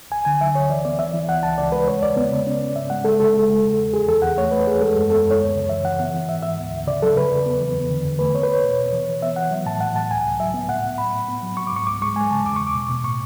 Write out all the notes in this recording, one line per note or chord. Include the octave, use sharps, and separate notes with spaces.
D2 G#5
D3 G#5
F#3 E5
D2 C#5
E3 D5
B3 D5
E3 E5
E3
C#2 F#5
C#2 A5
C#2 D5
G#3 B4
C#3 C#5
E2 D5
B3
C#3
C#4
C#4
G#2 E5
G#3 F#5
G#3 A4
C#3 A4
G#3
C#3
E2
E2
E2 G#4
E2 A4
E2 F#5
A3 C#5
A3 B4
E2 G#4
G#3 A4
F#2
B3 A4
F#2
C#5
D2
C#3
E3 E5
E3 F#5
B3
E3
G#2 E5
G#2 E5
D2
D2
C#3 D5
F#3 A4
C#3 B4
E2
B3
E3
E2
D3
E2
A3 B4
B3 C#5
B4
E2 C#5
B2
B2
E3
E3
B3 E5
E3 F#5
F#3
A2 A5
A2 F#5
A2 A5
C#2 G#5
C#2
F#3 E5
B3
A2 F#5
A2
A2 B5
A2
B3
F#3
F#3 C#6
D6
G#2 C#6
C#2 D6
G#3 C#6
G#3 G#5
C#3 A5
E2 D6
E2 C#6
D6
B2
B2
A2 C#6